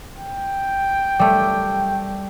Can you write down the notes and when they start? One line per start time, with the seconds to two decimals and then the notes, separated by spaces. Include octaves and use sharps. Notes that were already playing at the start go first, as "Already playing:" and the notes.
0.17 G5
1.19 G3 A3